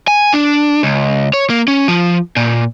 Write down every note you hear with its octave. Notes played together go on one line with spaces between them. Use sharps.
G#5
D4
C#2
C#5
A#3
C#4
F3
A#2